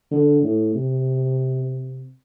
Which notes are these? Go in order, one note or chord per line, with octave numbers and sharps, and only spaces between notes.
D3
A2
C3